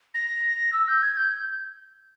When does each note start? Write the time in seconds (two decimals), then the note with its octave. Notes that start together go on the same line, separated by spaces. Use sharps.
0.14 A#6
0.72 E6
0.88 G6
1.02 G#6
1.17 G6